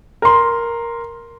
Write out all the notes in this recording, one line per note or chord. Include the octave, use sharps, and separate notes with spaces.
A#4 C6